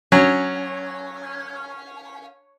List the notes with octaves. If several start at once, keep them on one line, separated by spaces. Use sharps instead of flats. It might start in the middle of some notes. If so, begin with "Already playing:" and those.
F#3 C#4